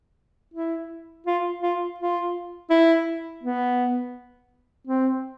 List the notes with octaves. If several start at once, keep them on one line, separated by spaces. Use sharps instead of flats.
E4
F4
F4
F4
E4
B3
C4